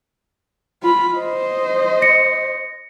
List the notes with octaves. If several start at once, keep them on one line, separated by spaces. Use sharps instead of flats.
F4 B5
C5 D#5
A#6 C#7